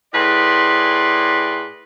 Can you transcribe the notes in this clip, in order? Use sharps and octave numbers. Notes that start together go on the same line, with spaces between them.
A2 G#4 B4 D5 C6